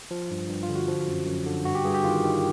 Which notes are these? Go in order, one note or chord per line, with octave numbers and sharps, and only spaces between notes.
F3
G2
G2
F4
D3
F#4
F3
F#2
F#2
D3
G2 F#4
G4
G2 G#4
G4
D#3 F4
D#3